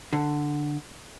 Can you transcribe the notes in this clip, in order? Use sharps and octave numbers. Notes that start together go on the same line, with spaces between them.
D3